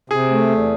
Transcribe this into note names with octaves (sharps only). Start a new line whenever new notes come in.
C3 G#4
A3
E2